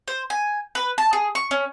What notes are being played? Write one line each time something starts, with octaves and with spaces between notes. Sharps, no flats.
C5
G#5
B4
A5
G#4
C#6
C#4